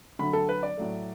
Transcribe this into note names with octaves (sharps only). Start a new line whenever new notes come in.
D3 F#3 A3 B5
A4
B4
D5
A2 F#3 A3